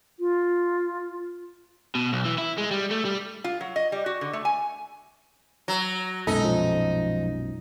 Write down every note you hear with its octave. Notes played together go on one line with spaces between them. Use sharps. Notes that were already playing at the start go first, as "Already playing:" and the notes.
F4
B2
B1
E3
E4
G#3
G3
A3
G3
F4
F#3
D#5
G3
F#4
D3
A3
G#5
F#3 A#5
B1 F#2 A#2 G#3 D#4 A4
F3